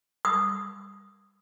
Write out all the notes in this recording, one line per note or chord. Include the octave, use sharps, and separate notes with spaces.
D#6